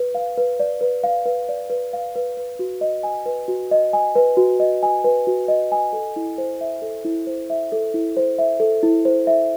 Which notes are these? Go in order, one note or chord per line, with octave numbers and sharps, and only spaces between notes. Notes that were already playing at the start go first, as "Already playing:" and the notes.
Already playing: B4
F5
B4
D5
B4
F5
B4
D5
B4
F5
B4
B4
F#4
D#5
G#5
B4
F#4
D#5
G#5
B4
F#4
D#5
G#5
B4
F#4
D#5
G#5
A4
E4
C5
E5
A4
E4
C5
E5
A4
E4
C5
E5
A4
E4
C5
E5